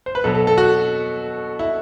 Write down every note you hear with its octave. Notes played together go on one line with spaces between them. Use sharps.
C5
B4
B2 F#3 B3 A4
A4
A4
F#4
E4